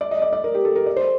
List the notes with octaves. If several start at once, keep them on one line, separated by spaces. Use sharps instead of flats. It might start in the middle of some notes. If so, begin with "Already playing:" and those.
D5
D#5
D5
D5
A#4
G4
A4
A#4
D5
C5